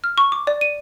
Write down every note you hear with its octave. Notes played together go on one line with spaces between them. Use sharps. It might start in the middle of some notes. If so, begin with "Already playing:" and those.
F6
C#6
D6
D5
D#7